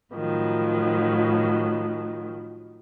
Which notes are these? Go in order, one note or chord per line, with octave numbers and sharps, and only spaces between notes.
A2 D#3 F3 F#3